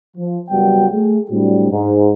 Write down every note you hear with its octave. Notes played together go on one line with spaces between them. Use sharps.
F3
F#1 F#2 G3 B3 F#4 G5
A3 G#4
A2 F#3 G3 C4 D4 F#4
G#2